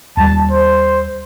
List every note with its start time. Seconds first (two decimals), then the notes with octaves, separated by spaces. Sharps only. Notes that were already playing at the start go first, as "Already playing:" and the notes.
0.17 D#2 G3 A5
0.50 C5